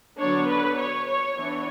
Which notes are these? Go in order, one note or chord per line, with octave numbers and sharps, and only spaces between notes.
D3 F#3 B3 D4 C#5
B4
C#5
C#5
E3 B3 D4 C#5